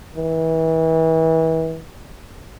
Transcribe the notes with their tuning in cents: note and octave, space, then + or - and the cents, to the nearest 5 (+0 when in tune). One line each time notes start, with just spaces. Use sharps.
E3 -30